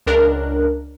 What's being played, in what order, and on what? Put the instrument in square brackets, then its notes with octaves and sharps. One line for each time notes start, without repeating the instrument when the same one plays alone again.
[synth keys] C#2 D4 A#4 F#6